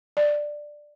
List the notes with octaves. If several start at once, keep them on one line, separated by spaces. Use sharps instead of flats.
D5